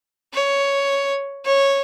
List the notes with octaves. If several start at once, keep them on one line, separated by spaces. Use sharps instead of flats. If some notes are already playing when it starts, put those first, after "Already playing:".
C#5
C#5